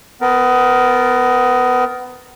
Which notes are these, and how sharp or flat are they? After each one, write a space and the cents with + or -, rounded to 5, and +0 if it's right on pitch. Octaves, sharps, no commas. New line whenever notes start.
B3 +25 A#4 +0